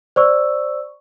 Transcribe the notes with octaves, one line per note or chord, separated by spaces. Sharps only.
C5 D5 C#6 E6